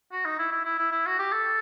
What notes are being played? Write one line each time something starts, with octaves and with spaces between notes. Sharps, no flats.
F#4
D#4
E4
E4
E4
E4
E4
F#4
G4
A4